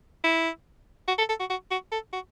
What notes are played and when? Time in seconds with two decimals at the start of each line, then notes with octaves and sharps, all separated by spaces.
0.24 E4
1.08 F#4
1.18 A4
1.29 A4
1.40 F#4
1.50 F#4
1.71 F#4
1.92 A4
2.13 F#4